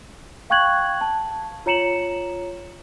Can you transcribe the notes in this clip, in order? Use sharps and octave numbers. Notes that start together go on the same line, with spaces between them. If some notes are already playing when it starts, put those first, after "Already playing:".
F5 G5 C#6 F#6 G#6 F#7
A5
F4 C#5 A#5 C#7 E7 F#7